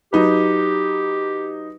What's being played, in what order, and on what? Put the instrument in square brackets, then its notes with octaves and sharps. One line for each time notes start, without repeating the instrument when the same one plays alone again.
[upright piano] F#3 D#4 B4 [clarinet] G4